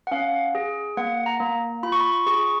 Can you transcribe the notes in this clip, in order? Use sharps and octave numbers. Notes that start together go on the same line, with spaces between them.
F#5
C#4 F5
G#4
A#3 F#5
A#5
A#3
F4 B5
C#6
B5
G#4 C#6